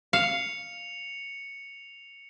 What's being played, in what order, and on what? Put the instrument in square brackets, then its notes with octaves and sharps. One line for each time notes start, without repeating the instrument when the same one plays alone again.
[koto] F5 [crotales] C#7 F7